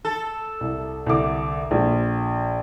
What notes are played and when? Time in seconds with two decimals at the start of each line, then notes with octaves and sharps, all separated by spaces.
0.05 A4
0.61 C2
1.06 C2 D3 D6
1.71 A#1